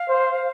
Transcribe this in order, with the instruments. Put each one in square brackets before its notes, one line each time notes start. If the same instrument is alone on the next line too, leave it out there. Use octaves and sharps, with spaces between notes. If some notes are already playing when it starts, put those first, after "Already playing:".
Already playing: [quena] F5
[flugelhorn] C5